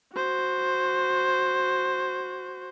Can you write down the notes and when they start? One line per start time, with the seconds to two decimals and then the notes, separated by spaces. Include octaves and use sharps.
0.13 F#4 C5